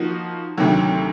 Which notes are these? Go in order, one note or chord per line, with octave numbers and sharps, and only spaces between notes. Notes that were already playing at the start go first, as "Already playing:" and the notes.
Already playing: F3 A#3 D#4 F#4
D2 C3 D#3 F#3